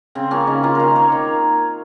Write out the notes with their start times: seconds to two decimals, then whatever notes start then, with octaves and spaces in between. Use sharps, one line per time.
0.15 C#3 C4
0.31 F3 A#3 C#4
0.47 C#3 D#4
0.63 F3 A#3 F4
0.75 D#3 A#4 C5
0.96 A#3 C#5
1.12 D#3